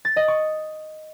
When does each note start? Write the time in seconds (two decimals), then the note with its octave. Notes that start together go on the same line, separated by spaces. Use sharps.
0.05 A6
0.16 D#5
0.28 C#6